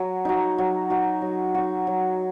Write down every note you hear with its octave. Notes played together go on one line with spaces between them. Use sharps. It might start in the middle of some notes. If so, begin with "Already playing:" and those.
Already playing: F#3
D#4 F#4
F#3
D#4 F#4
F#3
D#4 F#4
F#3